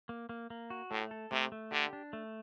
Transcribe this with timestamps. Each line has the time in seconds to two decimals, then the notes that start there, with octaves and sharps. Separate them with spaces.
0.09 A#3
0.29 A#3
0.50 A#3
0.70 F#4
0.90 A2 A3
1.11 A4
1.31 C3 A3
1.52 A3
1.72 D3 G4
1.93 D4
2.13 A3